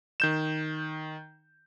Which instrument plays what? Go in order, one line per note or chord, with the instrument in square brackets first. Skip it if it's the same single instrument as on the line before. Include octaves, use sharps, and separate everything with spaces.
[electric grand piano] D#3 G6 E7